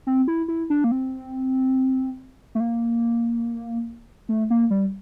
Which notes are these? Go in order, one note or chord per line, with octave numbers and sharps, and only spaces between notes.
C4
E4
E4
D4
A#3
C4
A3
A#3
A3
A#3
G3